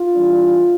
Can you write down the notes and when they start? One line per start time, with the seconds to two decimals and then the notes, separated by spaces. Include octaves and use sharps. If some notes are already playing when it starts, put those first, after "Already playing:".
Already playing: F4
0.14 E3 G3 D4